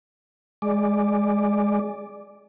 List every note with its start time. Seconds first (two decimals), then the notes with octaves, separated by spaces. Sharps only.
0.62 G#3 D5